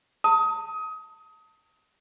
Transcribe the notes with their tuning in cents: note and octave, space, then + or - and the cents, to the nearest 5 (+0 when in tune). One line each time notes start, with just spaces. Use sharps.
A5 +40 D#6 +25